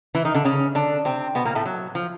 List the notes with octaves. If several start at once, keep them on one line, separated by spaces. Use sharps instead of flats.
E3 E4
D#3 D#4
D3 D4
C#3 C#4
D3 D4
C3 C4
B2 B3
A#2 A#3
A2 A3
F#3
F3